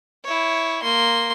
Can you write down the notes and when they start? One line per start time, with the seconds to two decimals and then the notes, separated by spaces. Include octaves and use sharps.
0.24 E4 C#5
0.83 A#3 C6